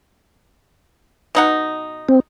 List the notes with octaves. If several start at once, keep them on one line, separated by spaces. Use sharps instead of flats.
B2 D#4 F#5
C4